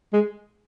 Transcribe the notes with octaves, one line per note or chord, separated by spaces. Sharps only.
G#3